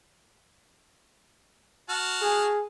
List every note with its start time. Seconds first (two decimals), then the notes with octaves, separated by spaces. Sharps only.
1.89 F#4 A5 F6
2.22 G#4